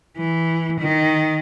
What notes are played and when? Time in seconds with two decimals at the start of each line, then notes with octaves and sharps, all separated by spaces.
0.17 E3
0.80 D#3